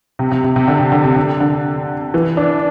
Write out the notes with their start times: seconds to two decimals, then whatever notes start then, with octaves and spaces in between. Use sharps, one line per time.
0.19 C3
0.32 C3
0.44 C3
0.56 C3
0.68 D3
0.79 C3
0.92 D3
1.04 C3
1.16 D3
1.40 D3
2.14 E3
2.37 D4